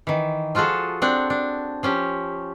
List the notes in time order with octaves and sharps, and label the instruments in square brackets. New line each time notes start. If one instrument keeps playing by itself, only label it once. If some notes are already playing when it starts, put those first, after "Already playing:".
[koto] D#3 E3
F3 F4 F#4 G#4 A4
C4 D4 F#5
D4
F3 C#4 G4